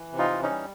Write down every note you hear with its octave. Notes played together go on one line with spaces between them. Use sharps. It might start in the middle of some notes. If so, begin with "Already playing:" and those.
Already playing: E3
C3
D#4 F4
E3
C#4 D#4
G3